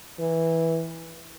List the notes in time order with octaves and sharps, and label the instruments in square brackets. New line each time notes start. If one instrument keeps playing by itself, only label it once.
[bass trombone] E3